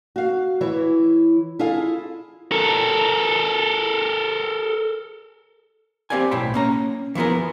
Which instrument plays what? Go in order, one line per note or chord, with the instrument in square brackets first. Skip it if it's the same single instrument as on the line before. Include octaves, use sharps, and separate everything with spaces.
[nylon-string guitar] F#4 F5
E3 E4 C#5
E4 F4 G#4 A4 F5
[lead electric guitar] A4 A#4
[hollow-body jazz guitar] C4 G4 D5 F5 G#5
B1 A2 C5 G5 B5
A#3 C#4 A#5
E3 F3 B3 G#4 A#4